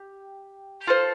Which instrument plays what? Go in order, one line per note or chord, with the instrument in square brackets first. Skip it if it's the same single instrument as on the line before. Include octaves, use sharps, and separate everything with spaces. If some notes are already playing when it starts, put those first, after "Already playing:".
Already playing: [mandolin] G4
F4 A4 C5